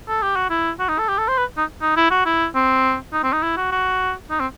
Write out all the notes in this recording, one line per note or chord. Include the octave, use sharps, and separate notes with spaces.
A4
G4
F#4
E4
F#4
D#4
A4
G4
A4
C5
B4
D#4
D#4
E4
F#4
E4
C4
D#4
C4
D#4
E4
F#4
F#4
D#4
C4